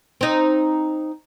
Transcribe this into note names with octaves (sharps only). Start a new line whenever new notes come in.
C4 D#4